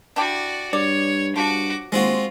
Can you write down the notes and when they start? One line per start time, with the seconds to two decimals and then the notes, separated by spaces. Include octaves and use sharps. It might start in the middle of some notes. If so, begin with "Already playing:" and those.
0.16 D4 E4 F#4 G4 D5
0.73 G2 C#5 D5
1.36 G2 F3 F#4 D6
1.92 D#2 G#3 C4 F4 F#4